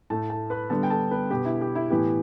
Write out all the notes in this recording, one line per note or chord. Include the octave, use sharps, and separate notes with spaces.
A2 A3 A4 A5
A4 A5
B4 B5
D3 G3 B3 A4 A5
G5
A4 A5
B3 B4
B2 B3 G4
E4
G4
E4
A2 E3 B3 G4